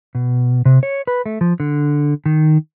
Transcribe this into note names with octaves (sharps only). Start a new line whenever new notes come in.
B2
C3
C#5
B4
A3
F3
D3
D#3